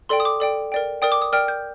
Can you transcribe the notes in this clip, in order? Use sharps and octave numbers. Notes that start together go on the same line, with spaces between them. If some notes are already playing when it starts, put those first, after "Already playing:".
A4 D5 G5 C6
D#6
D6
A4 D5 G5
A#4 D5 G5
A#4 D5 G5 D#6
D6
D#6
A#4 D5 G5 F6
G6